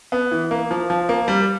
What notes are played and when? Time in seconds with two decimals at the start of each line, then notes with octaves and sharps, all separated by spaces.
0.12 B3
0.32 E3
0.51 A#3
0.71 F3
0.90 F3
1.09 A#3
1.28 G3